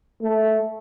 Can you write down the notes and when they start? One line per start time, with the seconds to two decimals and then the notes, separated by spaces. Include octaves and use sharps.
0.21 A3